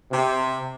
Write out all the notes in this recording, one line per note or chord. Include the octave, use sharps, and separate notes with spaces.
C3